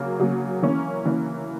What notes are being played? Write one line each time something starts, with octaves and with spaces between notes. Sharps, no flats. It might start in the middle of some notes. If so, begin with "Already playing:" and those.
Already playing: C#3 F#3 A#3
C#3 F#3 A#3
E3 A#3 C#4
E3 A#3 C#4